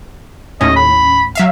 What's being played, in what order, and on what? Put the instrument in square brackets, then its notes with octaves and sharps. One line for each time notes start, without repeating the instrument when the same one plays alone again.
[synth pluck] D#2 A2 C#4 [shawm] D#5
[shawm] B5
[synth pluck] F#3 E5 F5